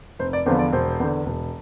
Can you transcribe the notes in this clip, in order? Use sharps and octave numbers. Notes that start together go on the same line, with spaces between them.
F1 C5
D5
E2 D3 F3 B3 C5
D5
E1 C5
E2 D3
E1